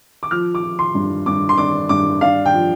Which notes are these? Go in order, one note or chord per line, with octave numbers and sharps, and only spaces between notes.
D6
F3 F6
D6
F3
C6
G2
G2 D6
C6
D4 D6
G2 D6
D4 F5
G5
F3